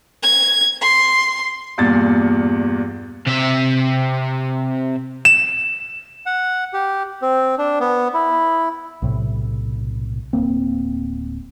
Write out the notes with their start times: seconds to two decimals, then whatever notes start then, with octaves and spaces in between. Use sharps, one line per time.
0.23 G#6
0.82 C6
1.78 E2 G2 A#2 A6
3.27 C3 E5
5.25 E7
6.26 F#5
6.73 G4
7.22 C4
7.58 D4
7.80 B3
8.14 E4
9.02 B1 A2 C3
10.33 D1 F#2 A#3 C4